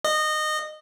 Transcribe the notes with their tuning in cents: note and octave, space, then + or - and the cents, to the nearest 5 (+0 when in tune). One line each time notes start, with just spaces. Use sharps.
D#5 -20